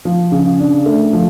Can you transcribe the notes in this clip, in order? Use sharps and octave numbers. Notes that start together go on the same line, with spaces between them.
F3
C#3
D4
A3
F3